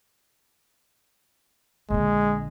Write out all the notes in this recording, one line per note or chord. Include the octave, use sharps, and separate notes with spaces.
A#1 D3 G#3